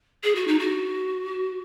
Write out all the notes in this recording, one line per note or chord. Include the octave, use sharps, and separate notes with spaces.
G#4
F#4
D#4
F#4